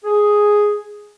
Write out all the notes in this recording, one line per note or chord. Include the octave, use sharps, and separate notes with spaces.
G#4